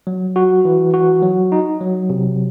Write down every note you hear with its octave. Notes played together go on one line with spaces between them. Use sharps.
F#3
F#4
E3
F#4
F#3
D#4
F#3
C3